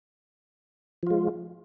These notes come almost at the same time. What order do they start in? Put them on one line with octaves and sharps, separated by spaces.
F3 F4 G#3